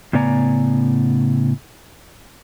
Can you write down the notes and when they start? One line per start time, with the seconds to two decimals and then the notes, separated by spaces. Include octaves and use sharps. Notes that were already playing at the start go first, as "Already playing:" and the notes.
0.13 A2 C#3 B3 D5 G#5 A#5